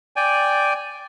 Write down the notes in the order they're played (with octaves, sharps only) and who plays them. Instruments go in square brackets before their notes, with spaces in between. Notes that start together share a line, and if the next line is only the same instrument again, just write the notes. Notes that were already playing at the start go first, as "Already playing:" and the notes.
[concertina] D5 G5 G#5